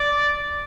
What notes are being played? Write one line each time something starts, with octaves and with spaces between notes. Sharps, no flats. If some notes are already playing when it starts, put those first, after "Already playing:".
Already playing: D5